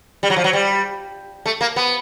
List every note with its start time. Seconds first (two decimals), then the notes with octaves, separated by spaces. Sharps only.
0.23 G3
0.30 F#3
0.36 F3
0.44 F#3
0.53 G3
1.46 A3
1.61 A#3
1.76 B3